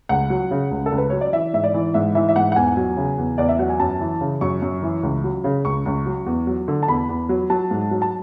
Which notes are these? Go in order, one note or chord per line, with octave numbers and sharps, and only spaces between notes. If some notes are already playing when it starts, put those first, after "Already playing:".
C#2 F#5
F#3
C#3
C#2
A4
C#2
B4
F#3 C#5
D5
E3 E5
G#2 E5
D5
E3
G#2 E5
E3 E5
E5
G#2 F#5
F#5
E2 G#5
F#3
C#3
E2
E2 D5
E5
F#3 F#5
G#5
F#2 A5
E3
C#3
F#2 C#6
F#2
E3
C#2
F#3
C#3
C#2 C#6
C#2
F#3
E2
F#3
D3
A5
E2 B5
E2
F#3
F#3 A5
G#2
F#3
A5